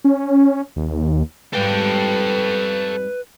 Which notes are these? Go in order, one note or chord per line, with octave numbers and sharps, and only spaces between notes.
C#4
D#2
F2 G#2 G3 A4 B4 G5